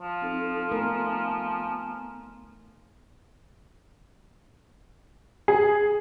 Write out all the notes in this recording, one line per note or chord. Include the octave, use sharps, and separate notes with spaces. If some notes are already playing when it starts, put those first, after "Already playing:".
F3
C4 D#4 A4
A3 B3 D#4 A#4 G#5 A#5
G#4